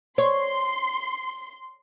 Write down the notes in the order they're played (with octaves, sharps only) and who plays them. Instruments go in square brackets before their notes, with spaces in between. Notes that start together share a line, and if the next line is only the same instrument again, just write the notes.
[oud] C#5 [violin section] C6